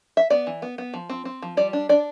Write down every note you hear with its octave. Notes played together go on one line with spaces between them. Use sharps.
E5
B3 D5
E3
B3
B3
F3
C4
C4
F3
G3 D5
D4
D4 D5